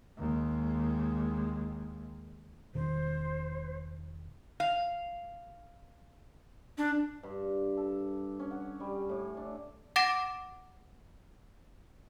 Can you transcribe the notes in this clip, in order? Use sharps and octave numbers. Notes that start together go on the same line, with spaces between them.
D#2 G#3
E1 B2 D#3 C5
F5
D4
G2
A4
C#4
F#5
G3
A2
D4
F#5 D6 A6 A#6 D7 E7